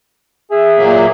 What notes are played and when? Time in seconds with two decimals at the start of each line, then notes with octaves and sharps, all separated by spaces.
0.51 G#4 E5
0.77 A#2 F#3 A#3